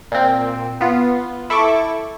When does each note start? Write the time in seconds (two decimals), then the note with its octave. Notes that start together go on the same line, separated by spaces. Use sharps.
0.12 A#2 C4
0.81 B3 F4
1.50 E4 A4 C#6 D6